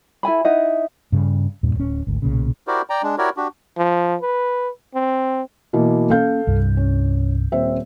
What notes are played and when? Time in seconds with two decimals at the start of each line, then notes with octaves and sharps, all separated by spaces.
0.23 E4 A4 G#5 B5
0.45 D#4 E4 D#5 F#5
1.12 G2 C#3
1.63 E2 G2 A#2
1.76 D1 C#4
2.07 G#1 D2
2.22 B1 A#2 C#3
2.67 E4 F#4 G4 A#4 C5 D5
2.90 D5 G5 A#5
3.03 G#3 D4
3.18 E4 F#4 G4 A#4 C#5 D5
3.37 D4 F#4 G4
3.78 F3
4.22 B4
4.95 C4
5.73 B2 E3 A#3
6.10 A#3 C#4 A4 F5 G6
6.47 C2 G2
6.77 C#4
7.52 D#1 C4 E5